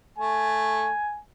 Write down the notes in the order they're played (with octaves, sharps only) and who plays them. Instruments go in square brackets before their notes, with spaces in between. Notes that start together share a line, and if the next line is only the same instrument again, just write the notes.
[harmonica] A3 [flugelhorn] G#5